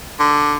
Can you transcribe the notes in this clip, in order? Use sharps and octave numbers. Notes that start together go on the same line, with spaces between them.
D3